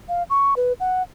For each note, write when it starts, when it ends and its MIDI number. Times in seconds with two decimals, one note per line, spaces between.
0.09 0.23 77
0.30 0.54 85
0.57 0.73 71
0.80 1.02 78